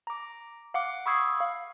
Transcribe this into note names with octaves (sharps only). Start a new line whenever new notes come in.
A#5 D6
F5 F#5 D6
B5 C#6 D#6 E6 G#6 C7
F5